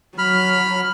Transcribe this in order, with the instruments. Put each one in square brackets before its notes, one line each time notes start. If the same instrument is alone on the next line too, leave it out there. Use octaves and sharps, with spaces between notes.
[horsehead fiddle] F#3 [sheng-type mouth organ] B5 F6